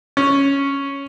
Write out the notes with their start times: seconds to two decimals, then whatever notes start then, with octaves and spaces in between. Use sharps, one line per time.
0.17 C#4